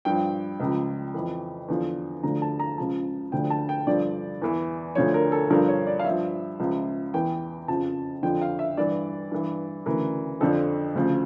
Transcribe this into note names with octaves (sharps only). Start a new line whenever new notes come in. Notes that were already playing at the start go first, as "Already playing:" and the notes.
G2 F3 G5
C#2 C#3 F3
F2 E3
E2 D3 F3
D2 D3 F3 A#5
A5
A#5
C#2 C#3 F3 A5
D2 D3 F3 G5
A5
G5
G2 D3 F3 D5
E2 E3
D2 D3 F3 C#5
A#4
A4
G2 D3 F3 A#4
C#5
D5
F5
G2 F3 E5
C#2 C#3 F3
E2 E3 G5
F2 C#3 F3 A5
F2 D3 F3 G5
F5
E5
G2 E3 D5
G2 E3
D2 C#3 E3 A#4
F2 D3 F3 A4
D2 C#3 F3